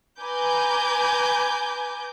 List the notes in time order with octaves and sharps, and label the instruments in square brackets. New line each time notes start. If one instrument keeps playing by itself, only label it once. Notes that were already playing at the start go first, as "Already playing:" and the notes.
[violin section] B4 G#5 A#5 D6 G6